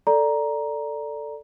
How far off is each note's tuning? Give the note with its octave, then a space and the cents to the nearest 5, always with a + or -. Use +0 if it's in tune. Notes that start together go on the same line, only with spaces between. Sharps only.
A4 +10 D5 +0 A#5 +10